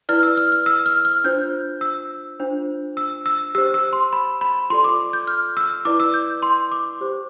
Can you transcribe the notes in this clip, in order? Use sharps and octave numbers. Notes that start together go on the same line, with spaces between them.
E4 B4 D5 F6
E6
F6
F6
E6
F6
F6
D4 F4 C5 G6
E6
D4 F4 C5
E6
E6
G4 C5 E6
E6
C6
B5
B5
F4 A4 D5 C6
D6
G6
F6
E6
E4 B4 D5 D6
E6
G6
C6
D6
G4 C5